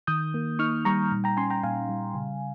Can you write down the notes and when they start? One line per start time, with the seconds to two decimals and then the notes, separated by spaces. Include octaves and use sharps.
0.07 D#3 D#6 G6
0.34 A#3
0.59 D#4 C#6 F6
0.85 G3 A#5 C#6
1.12 A#2
1.24 G5 A#5
1.37 C#4 G#5 C6
1.50 G5 A#5
1.63 A#2 F5 G#5
1.89 G3
2.15 C#3